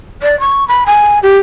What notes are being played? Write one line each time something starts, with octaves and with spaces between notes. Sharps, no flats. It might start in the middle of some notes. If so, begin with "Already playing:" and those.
D5
C#6
B5
G#5
G4